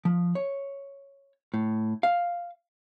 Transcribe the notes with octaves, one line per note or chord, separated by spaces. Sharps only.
F3
C#5
A2
F5